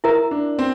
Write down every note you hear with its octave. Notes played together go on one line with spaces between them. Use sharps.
E4 A#4 E5 A#5
D4
C4